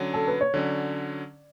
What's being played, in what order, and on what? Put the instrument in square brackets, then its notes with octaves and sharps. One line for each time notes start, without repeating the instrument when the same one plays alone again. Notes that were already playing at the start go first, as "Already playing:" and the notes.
Already playing: [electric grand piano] D3 F#3 C#4
[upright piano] A4
B4
C#5
[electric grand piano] D3 F#3 C#4 [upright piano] D5